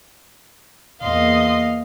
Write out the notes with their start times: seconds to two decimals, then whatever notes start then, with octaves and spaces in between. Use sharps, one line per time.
1.01 E2 A#3 D#5 F5 C6